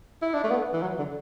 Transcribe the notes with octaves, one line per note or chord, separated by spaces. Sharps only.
E4
D4
A3
B3
E3
F#3
D3